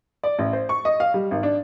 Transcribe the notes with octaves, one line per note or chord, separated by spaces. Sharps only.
D5
A1
C5
C#6
D#5
F5
G3
G#1
D4